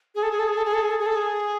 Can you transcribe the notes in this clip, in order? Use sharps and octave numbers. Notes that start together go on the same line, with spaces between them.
G#4
A4
G#4
A4
G#4
A4
G#4
A4
G#4
A4
G#4
A4
G#4